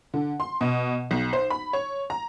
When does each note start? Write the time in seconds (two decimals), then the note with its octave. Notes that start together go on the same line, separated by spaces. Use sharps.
0.14 D3
0.40 C6
0.61 B2
1.11 B1
1.33 C5
1.50 B5
1.73 C#5
2.10 A#5